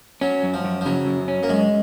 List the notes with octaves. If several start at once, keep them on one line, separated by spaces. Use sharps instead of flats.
F#3 C#4
F#2
F3
F#2
F3
C#3 F#3
F#2
C#4
A#3
F#2 G#3